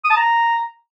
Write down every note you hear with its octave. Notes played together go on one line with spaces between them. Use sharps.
D#6
A5
A#5